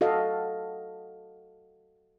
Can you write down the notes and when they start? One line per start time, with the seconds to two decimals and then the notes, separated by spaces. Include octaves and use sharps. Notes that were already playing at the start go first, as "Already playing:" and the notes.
0.01 F#4 A4 D#5 F5